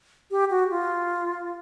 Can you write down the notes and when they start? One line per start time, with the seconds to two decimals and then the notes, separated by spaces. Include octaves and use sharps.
0.31 G4
0.51 F#4
0.70 F4